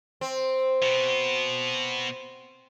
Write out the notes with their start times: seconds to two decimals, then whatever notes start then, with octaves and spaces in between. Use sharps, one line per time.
0.21 C4
0.83 B2 B3